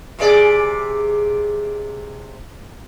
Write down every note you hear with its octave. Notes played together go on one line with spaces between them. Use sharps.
C3 G#4 D5